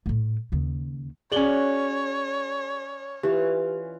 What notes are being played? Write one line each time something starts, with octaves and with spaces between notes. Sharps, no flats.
A2 A3
D#2 C#3
C#4 F#4 G#4 C#5 D5 F#7 G7
E3 F4 G4